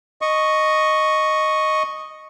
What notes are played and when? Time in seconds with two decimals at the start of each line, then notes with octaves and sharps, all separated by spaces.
0.22 D#5 C#6